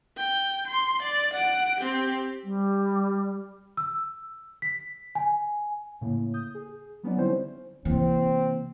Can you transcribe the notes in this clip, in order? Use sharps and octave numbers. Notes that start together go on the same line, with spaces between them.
G5
C6
D5
F#5 D7
C4 G4
G3
E6
B6
G#5
A2 C#3 A#3
D#6 G6
G#4
F#3 B3 C#4 D#4 D5
D3 G3 C4 C#4 E4 C5
C3 E3 A#3 C4